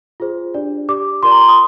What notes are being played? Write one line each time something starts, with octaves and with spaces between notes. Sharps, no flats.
F4 G#4 C5
D4 G4 D5
G4 D5 D6
F4 A#4 D5 C6
A#5
C6
D#6